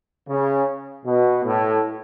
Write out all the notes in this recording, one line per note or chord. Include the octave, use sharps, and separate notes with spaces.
C#3
B2
A2